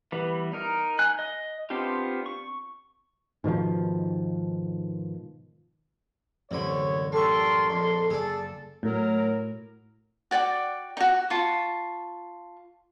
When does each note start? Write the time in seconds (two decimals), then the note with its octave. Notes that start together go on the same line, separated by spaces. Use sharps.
0.12 E3 G3 B3
0.53 D#4 A#4
0.99 G#5 F#6
1.19 D#5
1.70 B3 C4 D4 F4 G4
2.26 C#6
3.44 G#2 B2 D#3 F3
6.51 C2 F#2 A2 D3 E3 C#5 B5
7.12 G3 A4 A#4 D5 C6 C#6
7.70 A#1 F2 C6
8.10 F#1 G#4 A4 D5
8.83 A2 F#3 A#4
10.31 F#4 D5 G5 D6
10.97 D#4 F#4
11.30 F4 A5 C#6